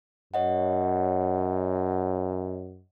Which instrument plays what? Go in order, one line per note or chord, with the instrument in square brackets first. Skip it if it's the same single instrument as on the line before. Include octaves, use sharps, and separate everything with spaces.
[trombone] F#2 [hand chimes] C#5 D#5 F#5